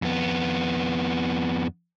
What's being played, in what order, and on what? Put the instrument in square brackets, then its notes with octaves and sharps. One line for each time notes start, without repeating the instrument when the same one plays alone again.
[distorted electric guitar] F2 B3